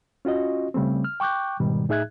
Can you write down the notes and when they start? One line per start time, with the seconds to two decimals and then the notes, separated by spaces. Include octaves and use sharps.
0.25 C#4 F4 F#4 D#5
0.74 C#3 G3 A3 C4
1.04 F6
1.20 G5 C#6 D6 F#6 G6
1.60 G#2 B2 D#3 G3
1.89 A2 D#4 G#4 E5 F#6 G#6